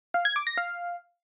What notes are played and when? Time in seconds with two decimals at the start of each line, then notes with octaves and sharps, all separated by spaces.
0.14 F5
0.25 G#6
0.36 D6
0.47 A#6
0.58 F5